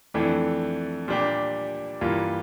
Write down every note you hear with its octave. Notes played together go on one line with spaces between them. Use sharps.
F2 E3 A3 D4
A#2 G3 D4 G4
G2 E3 A#3 F4